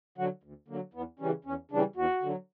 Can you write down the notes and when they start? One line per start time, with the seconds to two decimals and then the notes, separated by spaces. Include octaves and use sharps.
0.18 D3 F#3 F#4
0.43 D2
0.68 D3 F#3 A#3
0.94 E2 B3
1.19 C#3 E3 G3 C#4
1.45 E2 C#4
1.71 C#3 E3 G3 D4
1.96 E2 F#4
2.22 D3 F#3